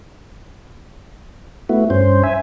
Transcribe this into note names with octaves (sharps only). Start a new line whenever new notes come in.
A3 B3 E4 F#4
G2 C#4 C5
E5 G#5